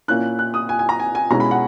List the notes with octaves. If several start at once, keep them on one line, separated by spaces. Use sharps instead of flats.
A#2 A#3 C#4 E4 F#6
F#6
D#6
G#5
G#5
A#5
G#5
G#5
B2 G#3 C#4 E4 A#5
B5
F#5